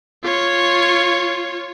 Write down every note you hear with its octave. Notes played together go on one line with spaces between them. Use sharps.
F4 C#5